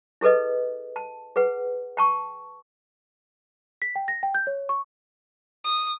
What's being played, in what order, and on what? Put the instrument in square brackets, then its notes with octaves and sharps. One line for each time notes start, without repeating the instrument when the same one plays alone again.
[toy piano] E4 G#4 A4 B4 D#5
A5
G#4 B4 F#5
G5 A5 C#6
[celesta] B6
G5
A#6
G5
G6
C#5
C#6
[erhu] D#6